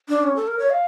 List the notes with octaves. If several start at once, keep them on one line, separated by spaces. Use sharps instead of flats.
D4
C#4
A4
A#4
C#5
F5